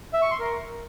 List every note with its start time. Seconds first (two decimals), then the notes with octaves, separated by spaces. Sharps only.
0.13 E5
0.22 C#6
0.31 C6
0.40 A#4